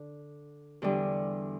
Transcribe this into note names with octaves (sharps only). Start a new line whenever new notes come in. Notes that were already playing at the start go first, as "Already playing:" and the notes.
Already playing: D3
E2 D3 G3